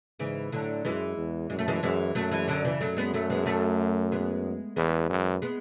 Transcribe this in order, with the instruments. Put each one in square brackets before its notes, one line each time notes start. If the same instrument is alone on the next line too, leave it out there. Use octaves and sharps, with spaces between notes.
[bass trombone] G#2 [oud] C#3 E3
[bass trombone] A2 [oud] D3 F#3
[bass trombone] F#2 [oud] E3 G#3
[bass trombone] E2
[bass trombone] F#2 [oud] G#3
[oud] A3
E3 G#3
[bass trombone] F#2 [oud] E3 G#3
[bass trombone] F#2 [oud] F#3 A3
[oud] E3 G#3
D3 F#3
C#3 E3
[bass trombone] F#2 [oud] F#3 A3
[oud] G#3 B3
F#3 A3
G#3 B3
F#3 A3
G#3 B3
[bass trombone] E2 [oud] E3 G#3
[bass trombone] F#2
[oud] G#3 B3